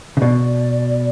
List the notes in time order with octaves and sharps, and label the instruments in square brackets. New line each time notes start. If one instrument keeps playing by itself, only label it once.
[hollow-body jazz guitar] C#3
[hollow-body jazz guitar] B2 [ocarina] D5